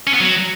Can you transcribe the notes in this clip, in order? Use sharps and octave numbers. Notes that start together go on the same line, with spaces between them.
C#4
B3
F#3